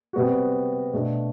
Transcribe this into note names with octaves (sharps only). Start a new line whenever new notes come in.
C3 G3 B3 F#4
B2 A3 D4